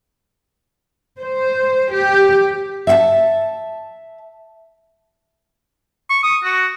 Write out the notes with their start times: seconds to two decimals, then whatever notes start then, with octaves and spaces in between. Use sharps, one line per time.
1.19 C5
1.92 G4
2.87 E5 F#5 A5
6.10 C#6
6.23 D#6
6.44 F#4